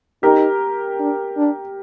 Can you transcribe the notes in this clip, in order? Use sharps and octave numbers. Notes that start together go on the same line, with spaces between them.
D#4 G4 A#4
D4
D4